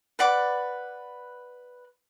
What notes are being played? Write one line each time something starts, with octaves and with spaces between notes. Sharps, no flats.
B4 D5 F#5 D6